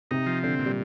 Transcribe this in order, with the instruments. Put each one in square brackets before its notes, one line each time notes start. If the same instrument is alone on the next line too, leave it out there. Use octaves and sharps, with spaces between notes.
[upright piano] C3 [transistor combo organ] D#4
[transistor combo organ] F3
[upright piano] D3 [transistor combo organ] C4
[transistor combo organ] A#2
[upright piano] G3